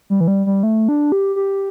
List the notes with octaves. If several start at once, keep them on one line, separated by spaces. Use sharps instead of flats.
G3
E3
G3
G3
A3
D4
G4
G4